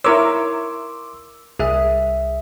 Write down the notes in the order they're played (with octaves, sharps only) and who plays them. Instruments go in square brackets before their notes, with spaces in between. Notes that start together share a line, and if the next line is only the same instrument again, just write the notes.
[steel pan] E4 A#4 C#5 [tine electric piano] C6 D6 E6
[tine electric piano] C2 E5 [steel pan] G#4